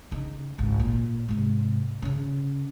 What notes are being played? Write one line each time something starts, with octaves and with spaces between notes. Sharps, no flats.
C#3 D#4
G#1 C#2
A#2
G#2 C3
C#3 C#4